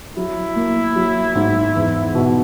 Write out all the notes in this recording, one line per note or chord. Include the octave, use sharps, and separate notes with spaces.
F#3 E4
A#3
F#3
G#2
E2
B2